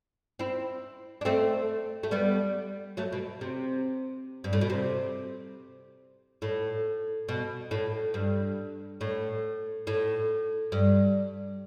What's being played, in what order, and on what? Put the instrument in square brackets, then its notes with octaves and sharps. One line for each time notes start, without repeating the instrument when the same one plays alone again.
[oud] C4 E4
D4
A3 C4
A3
G3 B3
F#3 A3
B2
C3
G2
A2
B2
C3
A2
B2
A2
G2
A2
A2
G2